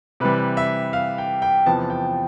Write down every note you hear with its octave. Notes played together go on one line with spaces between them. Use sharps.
C3 E3 G3 B4
E5
F5
G5
G5
E2 C3 F3 B3 A5
G5